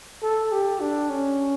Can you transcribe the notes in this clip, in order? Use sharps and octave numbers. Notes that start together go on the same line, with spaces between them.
A4
G4
D4
C#4